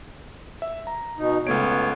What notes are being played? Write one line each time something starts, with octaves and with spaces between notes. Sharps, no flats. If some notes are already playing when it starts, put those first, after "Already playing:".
E5
A#5
B2 D#4
C#2 A3 B3 C#5 D7